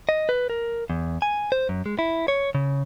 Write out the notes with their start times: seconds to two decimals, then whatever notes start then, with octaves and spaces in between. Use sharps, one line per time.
0.09 D#5
0.29 B4
0.50 A#4
0.90 E2
1.22 G#5
1.52 C5
1.69 F#2
1.86 G#3
1.99 E4
2.28 C#5
2.55 C#3